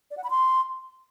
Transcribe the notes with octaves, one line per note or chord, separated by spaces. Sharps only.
D5
F#5
B5
C6